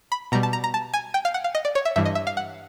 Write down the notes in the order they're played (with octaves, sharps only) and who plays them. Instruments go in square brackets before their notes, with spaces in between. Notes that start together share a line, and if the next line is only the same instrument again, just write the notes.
[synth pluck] B5
B2 G3 A#5
A5
A#5
A#5
A5
G#5
G5
F5
F#5
F5
D#5
D5
C#5
E5
G2 E3 G3 E5
D#5
E5
F5
F#5